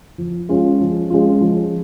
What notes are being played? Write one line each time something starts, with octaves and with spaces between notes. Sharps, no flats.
F3
G#3 C#4 F4
F3
G#3 C#4 F4
F3